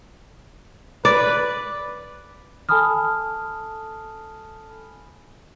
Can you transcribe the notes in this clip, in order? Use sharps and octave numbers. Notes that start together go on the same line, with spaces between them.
B4 D5
A4 G#5 A5 B5 D#6 F6